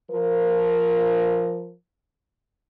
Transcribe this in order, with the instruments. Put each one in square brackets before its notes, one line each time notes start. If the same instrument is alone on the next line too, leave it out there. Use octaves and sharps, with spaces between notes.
[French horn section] F3 A#4